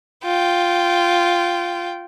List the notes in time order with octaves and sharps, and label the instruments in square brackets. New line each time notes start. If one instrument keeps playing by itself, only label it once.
[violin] F4 G5